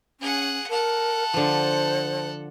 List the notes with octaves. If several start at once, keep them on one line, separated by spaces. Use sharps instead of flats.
C#4 G#4 F#5
A4 A#4 F#5
D3 F3 C5